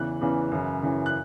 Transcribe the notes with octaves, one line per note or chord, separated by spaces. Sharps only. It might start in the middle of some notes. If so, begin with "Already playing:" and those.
Already playing: E2 C#3 E3 F#6
E2 C#3 E3
F#2 C#3 E3
F#2 C#3 E3
F#6